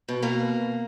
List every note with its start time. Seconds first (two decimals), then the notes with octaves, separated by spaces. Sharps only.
0.09 B2
0.23 B2 A#3